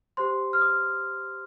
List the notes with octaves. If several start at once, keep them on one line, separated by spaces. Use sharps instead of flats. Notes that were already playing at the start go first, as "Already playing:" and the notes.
G4 C5 C6
F6
D#6